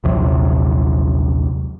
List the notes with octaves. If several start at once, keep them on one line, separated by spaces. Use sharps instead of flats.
A#1 D#2 C3 F#3